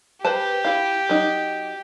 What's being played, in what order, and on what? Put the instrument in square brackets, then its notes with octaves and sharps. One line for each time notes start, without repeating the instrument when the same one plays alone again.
[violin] G4 [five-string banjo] B4 C5 A5
[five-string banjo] E4 F5
F#3 D#4